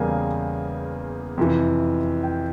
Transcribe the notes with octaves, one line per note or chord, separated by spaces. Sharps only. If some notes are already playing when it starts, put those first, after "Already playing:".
Already playing: E2 C#3 G3 A#3 G#5
F2 C3 E3
G5